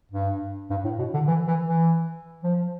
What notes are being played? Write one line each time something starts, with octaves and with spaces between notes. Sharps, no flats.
G2
G2
A2
B2
D3
E3
E3
E3
F3